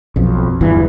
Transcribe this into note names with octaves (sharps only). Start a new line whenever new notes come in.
B1 F2
G1 E2 E3